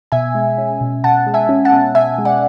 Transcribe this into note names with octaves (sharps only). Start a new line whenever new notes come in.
B2 E5 G#5
G#3
C#4
B2
B2 F#5 A5
G#3
E5 G#5
C#4
F#5 A5
B2
B2 E5 G#5
G#3
D5 F#5